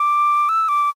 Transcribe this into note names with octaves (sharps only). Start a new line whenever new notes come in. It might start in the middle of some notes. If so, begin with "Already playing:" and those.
Already playing: D6
E6
D6